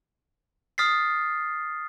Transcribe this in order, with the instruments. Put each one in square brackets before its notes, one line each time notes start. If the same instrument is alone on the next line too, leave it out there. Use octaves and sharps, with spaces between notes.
[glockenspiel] D#6 F6 A6 B6 C7